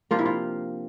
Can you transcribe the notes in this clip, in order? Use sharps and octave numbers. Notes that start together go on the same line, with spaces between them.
C3 F3 A#3 D4 F4
E4
F4